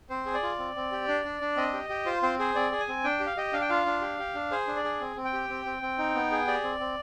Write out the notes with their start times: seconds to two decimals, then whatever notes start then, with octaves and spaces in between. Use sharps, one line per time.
0.10 C4 C5
0.26 G#4
0.34 D5
0.43 F4
0.59 C4
0.76 C4
0.92 G4
1.08 D4
1.24 D4
1.41 D4
1.57 C4 D#5
1.73 G4
1.89 G4
2.06 F4 C5
2.22 C4 C5
2.39 G#4 C5
2.55 C4 D5
2.72 G#4
2.80 G#5
2.88 C4
3.04 D4 G5
3.20 G4
3.26 F5
3.37 G4 D#5
3.53 D4 F5
3.61 G5
3.69 F4 F5
3.86 D4
4.02 G4
4.19 G4
4.35 D4
4.51 G#4 C5
4.67 D4
4.76 D5
4.84 G#4
5.01 C4
5.16 C4
5.25 G5
5.33 G4
5.49 C4
5.65 C4
5.82 C4
5.99 D#4
6.15 B3
6.31 G#4
6.47 G4 D5
6.63 C4
6.80 C4